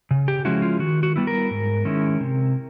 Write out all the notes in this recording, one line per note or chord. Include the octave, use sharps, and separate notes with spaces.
C#3
G4
F3 G#3 C#4 E4 F#4
F4
D#3 F#4
F#4
G3 B3 E4
A#4
G#2
D#3 G#3 C#4 E4
C3